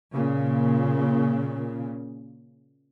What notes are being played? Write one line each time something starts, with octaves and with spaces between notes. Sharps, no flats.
A#2 C#3